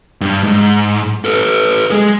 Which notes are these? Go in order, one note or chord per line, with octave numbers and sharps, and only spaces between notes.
G2
G#2
A4 B4
G#3 G#4